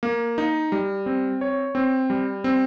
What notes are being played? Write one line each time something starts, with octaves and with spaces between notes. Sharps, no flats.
A#3
D#4
G3
C4
C#5
C4
G3
C4